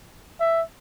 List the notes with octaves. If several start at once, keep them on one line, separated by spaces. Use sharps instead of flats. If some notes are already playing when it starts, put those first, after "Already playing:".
E5